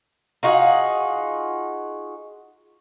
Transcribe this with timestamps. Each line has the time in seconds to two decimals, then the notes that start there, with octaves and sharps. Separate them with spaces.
0.43 D#4 F4 F#4 G#4